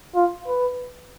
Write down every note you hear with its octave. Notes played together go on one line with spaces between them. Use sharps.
F4
B4